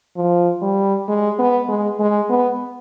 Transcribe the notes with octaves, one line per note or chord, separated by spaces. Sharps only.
F3
G3
G#3
B3
G#3
G#3
B3